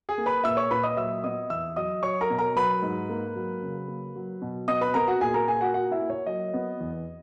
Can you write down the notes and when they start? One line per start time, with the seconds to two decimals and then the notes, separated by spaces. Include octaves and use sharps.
0.09 G#4 G#5
0.18 A#3
0.26 B4 B5
0.44 A#2 E5 E6
0.57 C#5 C#6
0.71 A#2 B4 B5
0.83 D#5 D#6
0.97 F#3 E5 E6
1.24 B3 D#5 D#6
1.50 E2 E5 E6
1.76 F#3 D#5 D#6
2.03 F#3 C#5 C#6
2.21 A#4 A#5
2.30 B2
2.39 A#4 A#5
2.56 F#3 B4 B5
2.83 G#2
3.10 A#3
3.36 F#3
3.62 C#3
3.88 A#3
4.16 F#3
4.42 B2
4.68 B3 D#5 D#6
4.81 B4 B5
4.94 B3 A#4 A#5
5.08 F#4 F#5
5.21 A#2 G#4 G#5
5.34 A#4 A#5
5.48 A#3 G#4 G#5
5.61 F#4 F#5
5.74 A#3 F#4 F#5
5.92 E4 E5
6.01 A#3
6.10 C#5
6.26 F#3 D#5
6.54 B3
6.80 E2